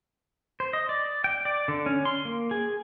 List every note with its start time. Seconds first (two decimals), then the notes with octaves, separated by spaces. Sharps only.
0.60 C5
0.73 D#5
0.89 D5
1.24 G5
1.45 D5
1.68 D3
1.86 C#4
2.05 C6
2.25 A#3
2.51 G#4